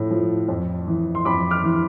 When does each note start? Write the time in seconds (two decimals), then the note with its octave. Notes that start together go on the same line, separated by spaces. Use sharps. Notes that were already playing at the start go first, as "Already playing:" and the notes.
Already playing: A2 F3
0.11 F3
0.48 F2
0.87 E3
1.15 C6
1.25 F2 B5 D6
1.50 D6 F6
1.64 E3